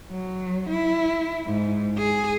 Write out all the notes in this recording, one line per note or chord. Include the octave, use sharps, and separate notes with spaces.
F#3
E4
G#2
G#4